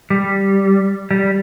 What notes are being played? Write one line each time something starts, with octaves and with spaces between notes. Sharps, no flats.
G3
G3